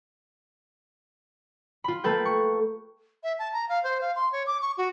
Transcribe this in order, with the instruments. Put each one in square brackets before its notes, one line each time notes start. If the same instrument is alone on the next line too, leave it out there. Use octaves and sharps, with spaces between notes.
[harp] F4 B5
A3 A#3 A4 B4 G5
C#6
[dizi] E5
A5
A#5
F5
C5
F5
C6
C#5
D6
C#6
F#4